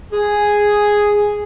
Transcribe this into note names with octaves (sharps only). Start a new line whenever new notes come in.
G#4